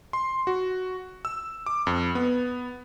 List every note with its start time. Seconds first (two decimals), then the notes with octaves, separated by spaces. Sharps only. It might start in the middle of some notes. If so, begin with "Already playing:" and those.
0.13 C6
0.47 F#4
1.25 E6
1.66 D6
1.87 F2
2.15 B3